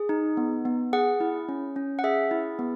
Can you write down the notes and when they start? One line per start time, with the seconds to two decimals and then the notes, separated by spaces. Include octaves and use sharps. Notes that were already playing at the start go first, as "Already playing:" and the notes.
Already playing: G#4
0.09 D#4
0.37 B3
0.65 B3
0.93 G#4 F#5
1.20 E4
1.49 C#4
1.76 C#4
1.99 F#5
2.04 G#4 E5
2.31 E4
2.59 B3